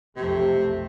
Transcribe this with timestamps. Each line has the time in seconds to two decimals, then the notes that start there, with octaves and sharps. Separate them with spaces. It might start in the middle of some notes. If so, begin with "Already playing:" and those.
0.17 B1 F2 C3 A3